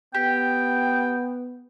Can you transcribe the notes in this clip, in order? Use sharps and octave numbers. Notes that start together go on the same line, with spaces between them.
B3 G4 G5